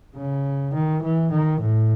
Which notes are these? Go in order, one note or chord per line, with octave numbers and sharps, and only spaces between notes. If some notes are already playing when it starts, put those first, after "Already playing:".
C#3
D#3
E3
D#3
A2